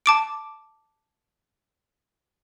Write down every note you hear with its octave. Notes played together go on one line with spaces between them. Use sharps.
A5 D6 D7